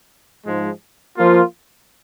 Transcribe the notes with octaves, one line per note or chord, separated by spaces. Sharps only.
G#2 F3 G#3
F3 A#3 F4